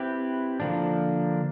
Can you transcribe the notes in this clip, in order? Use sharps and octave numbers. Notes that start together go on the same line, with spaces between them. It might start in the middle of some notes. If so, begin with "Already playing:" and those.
Already playing: C4 E4 G4 B4
D3 F3 A#3 D4